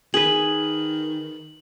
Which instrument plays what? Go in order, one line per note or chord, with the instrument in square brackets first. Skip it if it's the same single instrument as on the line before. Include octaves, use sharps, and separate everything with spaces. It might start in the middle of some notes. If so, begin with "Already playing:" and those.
[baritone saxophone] D#3 [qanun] G#4 B4 [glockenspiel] F#7